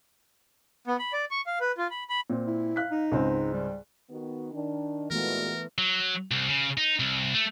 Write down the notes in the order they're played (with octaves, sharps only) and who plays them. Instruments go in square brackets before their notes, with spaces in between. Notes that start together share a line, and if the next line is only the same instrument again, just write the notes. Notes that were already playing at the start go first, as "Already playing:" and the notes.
[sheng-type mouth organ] B3
B5
D5
C#6
F5
B4
F4
B5
B5
[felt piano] A#2 C4
[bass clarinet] E4
[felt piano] F5 F#6 B6
[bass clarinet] D#4
[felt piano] C#2 G#2 C4
[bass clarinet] G3
[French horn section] D#3 B3 F#4
D#3 D4
[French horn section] A#2 G#3 F#4 [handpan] E3 A3 B3 [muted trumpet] A#4
[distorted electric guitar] F#3
C2
C#3
D#4
C2
A3